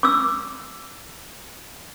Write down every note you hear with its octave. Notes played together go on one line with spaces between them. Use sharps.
D6 E6